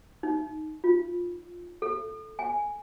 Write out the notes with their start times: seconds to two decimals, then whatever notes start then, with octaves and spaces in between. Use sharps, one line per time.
0.23 D#4
0.84 F4
1.82 A4
2.39 G#5